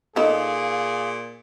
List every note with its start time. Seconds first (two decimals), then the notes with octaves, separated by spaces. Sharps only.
0.16 A#2 D#4 F4 G#4 A4 F5